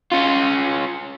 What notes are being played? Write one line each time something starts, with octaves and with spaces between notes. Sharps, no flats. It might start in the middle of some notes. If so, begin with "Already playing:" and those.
C#4 F4